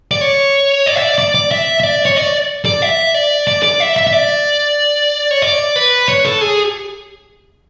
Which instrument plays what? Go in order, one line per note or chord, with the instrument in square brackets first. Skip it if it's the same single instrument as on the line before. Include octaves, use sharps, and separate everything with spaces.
[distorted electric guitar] D5
C#5
D5
E5
D5
D5
D5
E5
E5
D5
C#5
D5
D5
E5
D5
D5
D5
E5
E5
E5
D5
C#5
D5
B4
C#5
A4
G#4